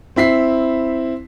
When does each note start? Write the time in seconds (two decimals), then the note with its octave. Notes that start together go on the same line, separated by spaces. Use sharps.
0.16 C4 E4 B6 C7